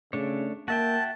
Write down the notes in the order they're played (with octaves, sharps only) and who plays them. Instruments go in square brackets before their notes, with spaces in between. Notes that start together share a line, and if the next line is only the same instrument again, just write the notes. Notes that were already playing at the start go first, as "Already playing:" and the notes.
[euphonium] C#3 [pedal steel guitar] A3 D4 C#5
[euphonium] A#3 [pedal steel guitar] F#4 E5 G5 [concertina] A5